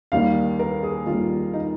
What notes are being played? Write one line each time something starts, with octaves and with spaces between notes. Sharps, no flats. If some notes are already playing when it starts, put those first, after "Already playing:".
D#2 D#3 G3 F5
A#4
G#4
D#2 D#3 G3 F4
D#4